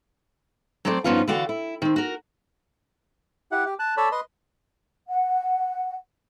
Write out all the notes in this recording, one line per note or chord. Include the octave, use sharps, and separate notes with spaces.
F#3 A3 C4 C5 D5
G2 F3 B3 C#4 D#4 F4
D3 E3 F#4 D5 F5 G5
E4
D#3 C4
F#4 A#4
E4 G4 F#5
G4
A5 F#6
A4 C#5 D5 A5 B5
B4 D#5 C6
F#5